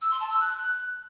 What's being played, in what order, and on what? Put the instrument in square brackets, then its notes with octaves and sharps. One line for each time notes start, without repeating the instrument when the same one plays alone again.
[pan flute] E6
C6
A5
E6
F#6